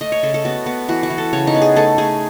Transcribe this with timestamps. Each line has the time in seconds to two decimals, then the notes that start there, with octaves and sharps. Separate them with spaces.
0.01 A3 D#5
0.12 C#5
0.23 C#3 A4
0.34 A4
0.45 B3 F#4
0.66 B3
0.89 E3 F#4
1.03 F#4
1.10 E3
1.18 A4
1.33 C#3 C#5
1.47 D#4
1.54 B3
1.62 G#4
1.76 A3 A4
1.98 A3 G#4